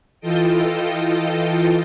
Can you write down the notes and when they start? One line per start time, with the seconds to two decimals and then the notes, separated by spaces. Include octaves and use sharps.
0.21 E3 F4 A4 D#5 G5